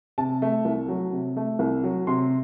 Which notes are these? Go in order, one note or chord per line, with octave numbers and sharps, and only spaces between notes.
C3 A5
A3
C2
F#3
C3
A3
C2
F#3
C3 C6